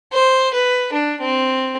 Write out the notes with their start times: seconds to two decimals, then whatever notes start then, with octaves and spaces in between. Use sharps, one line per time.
0.12 C5
0.53 B4
0.93 D4
1.21 C4